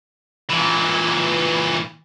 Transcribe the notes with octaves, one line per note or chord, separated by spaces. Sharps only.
A#2 E3